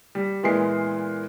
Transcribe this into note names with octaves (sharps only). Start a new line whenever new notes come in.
G3
A#2 E3 G#3 B3 C7